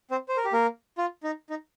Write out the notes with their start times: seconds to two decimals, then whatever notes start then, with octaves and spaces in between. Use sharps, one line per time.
0.11 C4 C5
0.29 C5
0.37 A#4
0.45 G4
0.53 A#3 A#4
0.98 F4
1.23 D#4
1.50 D#4